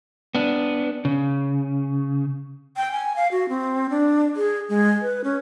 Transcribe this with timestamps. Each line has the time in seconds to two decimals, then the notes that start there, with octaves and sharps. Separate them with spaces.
0.35 B3 D4
1.05 C#3
2.77 G5
2.92 G#5
3.16 F5
3.32 F#4
3.49 C4
3.90 D4
4.36 G#4
4.69 G#3
5.02 B4
5.24 C#4